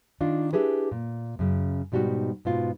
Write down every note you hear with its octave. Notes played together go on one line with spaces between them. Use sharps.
D#3 D4 D#4 F4
D4 E4 G4 G#4 B4
A#2
F#2 C#3
G#2 B2 G3 D#4 F#4
G#2 B2 F4